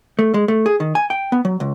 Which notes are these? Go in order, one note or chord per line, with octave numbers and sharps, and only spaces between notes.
A3
G#3
A3
G#4
D#3
G#5
G5
B3
F#3
C#2